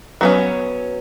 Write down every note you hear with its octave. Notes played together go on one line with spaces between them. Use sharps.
F#3 B3 C#4